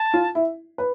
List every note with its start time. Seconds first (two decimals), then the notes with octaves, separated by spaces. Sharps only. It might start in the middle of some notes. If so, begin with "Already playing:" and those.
Already playing: A5
0.13 F4
0.35 E4
0.78 B4